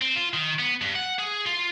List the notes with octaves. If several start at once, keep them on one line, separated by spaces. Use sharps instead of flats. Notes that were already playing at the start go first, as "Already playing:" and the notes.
C4
F4
D#3
B3
G2
F#5
G#4
F4